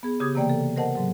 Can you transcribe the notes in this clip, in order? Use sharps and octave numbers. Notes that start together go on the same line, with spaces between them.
B3 G#4
C#3 G4 D6 D#6 G#6
C3 E3 A#3 D5 G5
A4
A#4 C5 D#5 F#5 A5
G#2 F#3